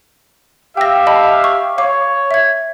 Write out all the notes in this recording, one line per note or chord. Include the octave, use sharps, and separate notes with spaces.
G4 E5 F5 G5 A#6
D#5 A5 B5
C#6
C#5 F5 D6
E5 G#6